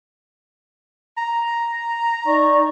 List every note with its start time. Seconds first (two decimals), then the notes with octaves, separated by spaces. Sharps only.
1.18 A#5
2.26 D#4 D5 C#6